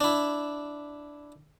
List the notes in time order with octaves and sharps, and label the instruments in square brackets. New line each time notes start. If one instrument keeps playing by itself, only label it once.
[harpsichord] D4 E4